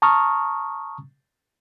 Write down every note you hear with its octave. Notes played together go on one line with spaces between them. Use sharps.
A5 A#5 C#6 D#6 F6